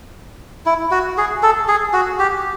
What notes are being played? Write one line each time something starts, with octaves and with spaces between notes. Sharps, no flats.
E4
F#4
G#4
A4
G#4
F#4
G4